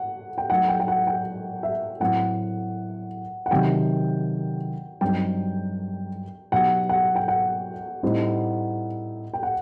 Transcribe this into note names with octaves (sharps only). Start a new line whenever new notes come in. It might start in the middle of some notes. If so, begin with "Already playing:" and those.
Already playing: F#5
G5
F#3 A3 D#4 F#5
G5
G5
F#5
G5
E5
A2 F#3 C4 F#5
F#5
C3 D#3 F#3 G5
G2 F#3 C4 D#4 G5
B2 F#3 B3 D#4 G4 F#5
F#5
G5
F#5
A2 G3 C4 D#4
G5
F#5